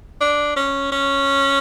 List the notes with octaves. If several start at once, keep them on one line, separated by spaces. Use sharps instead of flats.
D4
C#4
C#4